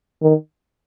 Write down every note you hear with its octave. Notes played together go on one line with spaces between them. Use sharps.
D#3